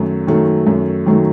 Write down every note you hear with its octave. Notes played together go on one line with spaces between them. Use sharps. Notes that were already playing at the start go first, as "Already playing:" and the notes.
Already playing: F#2 D#3 F#3 A3
D#3 F#3 A3
F#2
D#3 F#3 A3